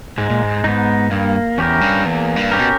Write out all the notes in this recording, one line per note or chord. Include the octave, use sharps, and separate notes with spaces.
G#2 G#3
A#2
G#2
G#2 B3 D#4
G2 A#3
E2 C#4 G4 A#4
G2
E2 A#3
G2
C#4 G4 A#4
B2